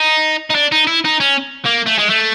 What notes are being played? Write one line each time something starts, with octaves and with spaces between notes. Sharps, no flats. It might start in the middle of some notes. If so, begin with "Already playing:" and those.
Already playing: D#4
D#4
D4
D#4
E4
D#4
C#4
A#3
A3
G#3
A3